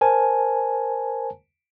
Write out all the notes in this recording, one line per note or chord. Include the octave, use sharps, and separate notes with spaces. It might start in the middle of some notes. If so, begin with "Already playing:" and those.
A#4 C5 G#5 A5